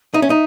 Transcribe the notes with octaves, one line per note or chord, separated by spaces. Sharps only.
D#4 E5
C#4
D#4